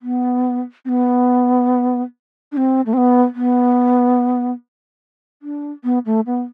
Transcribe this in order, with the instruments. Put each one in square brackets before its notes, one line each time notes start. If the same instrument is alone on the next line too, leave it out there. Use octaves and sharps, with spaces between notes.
[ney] B3
C4
B3
D4
C4
A3
C4
B3
B3
D4
B3
A3
B3